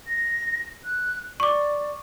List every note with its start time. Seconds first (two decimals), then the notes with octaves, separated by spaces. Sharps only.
0.07 A#6
0.85 F#6
1.40 D5 C#6 D6